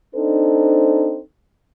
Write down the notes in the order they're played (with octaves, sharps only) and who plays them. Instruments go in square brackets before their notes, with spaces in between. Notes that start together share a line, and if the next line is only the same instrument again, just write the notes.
[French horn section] C4 D4 D#4 A4 C5